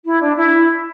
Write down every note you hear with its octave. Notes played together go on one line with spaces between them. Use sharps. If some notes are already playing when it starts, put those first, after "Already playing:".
E4
D4
E4